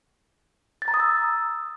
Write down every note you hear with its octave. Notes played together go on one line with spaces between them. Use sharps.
A6
A#5
D#6
E6